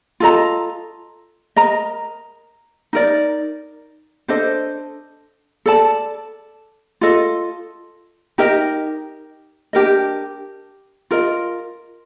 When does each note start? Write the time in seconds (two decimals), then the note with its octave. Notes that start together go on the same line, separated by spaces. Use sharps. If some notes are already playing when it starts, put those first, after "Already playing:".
0.20 F4 A4 D#5 A#5
1.56 A#4 D#5 A#5
2.93 D#4 A#4 D5
4.28 D4 A4 C5 D#5
5.66 A4 D5 A5
7.01 F4 A4 D#5
8.38 D#4 G4 A#4 D#5
9.73 D4 G4 A#4 D#5
11.11 F4 A#4 D#5